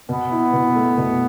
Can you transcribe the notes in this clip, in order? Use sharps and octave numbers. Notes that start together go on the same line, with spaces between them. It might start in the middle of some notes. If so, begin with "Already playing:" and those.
B2 B3
E4
B2
A3
B2